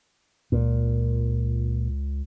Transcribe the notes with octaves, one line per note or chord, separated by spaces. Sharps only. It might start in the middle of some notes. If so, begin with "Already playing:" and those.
C#2 A#2